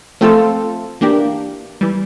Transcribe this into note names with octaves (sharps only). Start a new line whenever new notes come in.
F3 A3 C4 F4 A4
E3 A#3 D4 G4
E3 G3